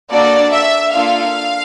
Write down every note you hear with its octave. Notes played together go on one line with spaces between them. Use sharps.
A#3 D4 F#4 A4 D5
E5
A#3 D4 F4 A4 F5